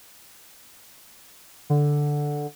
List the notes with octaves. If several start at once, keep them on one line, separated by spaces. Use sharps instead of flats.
D3